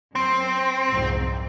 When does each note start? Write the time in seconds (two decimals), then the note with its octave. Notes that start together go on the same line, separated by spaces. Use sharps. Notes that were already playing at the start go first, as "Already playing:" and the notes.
0.15 F#2 C4
0.89 C2 F2 G#2